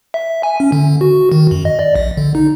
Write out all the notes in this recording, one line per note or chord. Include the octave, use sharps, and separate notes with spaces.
E5
G#5
C#4
D3
F#4
D#3
F#2
D#5
D5
A#1
D3
D#4